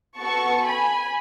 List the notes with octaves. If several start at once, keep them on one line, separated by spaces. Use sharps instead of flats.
B3 F#4 A4 A5 C#6
G#5 B5